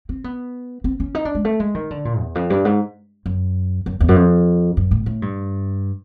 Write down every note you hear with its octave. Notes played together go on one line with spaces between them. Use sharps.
C4
B3
C4
C#4
D#4
D4
G#3
A3
G#3
D#3
D3
A#2
E2
F2
G2
G#2
F#2
F#2
E2
F#2
F2
F#2
A2
A2
G2